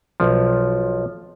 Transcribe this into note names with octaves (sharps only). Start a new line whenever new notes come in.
B1 F3